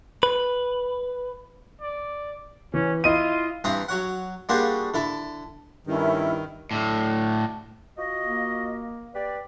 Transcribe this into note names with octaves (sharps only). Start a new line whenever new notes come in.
B4
D5
E3 C#4
E4 F4 D#5 D#7
G2 E3 C4 A#5 D#6
F#3 C#5 F#5
G3 A#3 D4 F#4 G#4 C5
D3 E4 A4
G2 D#3 A3 C#4 E4 A#4
A2 D3
F4 F#4 D#5
A#3
G4 B4 D5